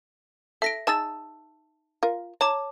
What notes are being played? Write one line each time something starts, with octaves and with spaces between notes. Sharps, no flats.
A4 E5 A#6 D7
D#4 G#4 A5 E6 A6
F4 A#4
C#5 A5 A#5 D6